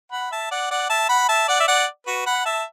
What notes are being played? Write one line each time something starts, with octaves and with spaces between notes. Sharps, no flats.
F#5 B5
E5 A5
D5 F#5
D5 F#5
E5 A5
F#5 B5
E5 A5
D5 F#5
E5
D5 F#5
F#4 B4
F#5 B5
E5 A5